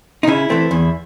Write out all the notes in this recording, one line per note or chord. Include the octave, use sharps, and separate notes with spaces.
D#4
C#3 E4
E3 A3 C4
E2